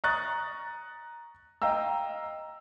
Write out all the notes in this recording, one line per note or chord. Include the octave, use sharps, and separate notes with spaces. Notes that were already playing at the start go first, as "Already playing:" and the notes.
A#5 C#6 D#6 F#6 A6
D#5 F5 G5 A#5 E6